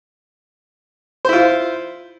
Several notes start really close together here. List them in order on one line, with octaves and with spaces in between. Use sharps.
C5 E4 F4